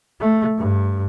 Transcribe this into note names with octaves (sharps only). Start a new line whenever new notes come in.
A3
G2